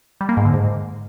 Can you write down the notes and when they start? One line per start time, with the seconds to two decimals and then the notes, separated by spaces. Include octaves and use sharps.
0.21 G3
0.29 A#3
0.37 G#2
0.45 D3
0.53 G#2